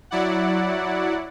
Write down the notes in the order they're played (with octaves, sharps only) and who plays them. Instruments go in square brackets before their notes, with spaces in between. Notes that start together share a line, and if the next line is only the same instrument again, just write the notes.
[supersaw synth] F#3 E4 D5 F#5